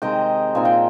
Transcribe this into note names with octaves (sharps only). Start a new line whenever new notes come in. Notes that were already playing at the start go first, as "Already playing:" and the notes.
C3 D#3 G#3 D#5 G5
A#2 F3 C4 D#4 G#5
G5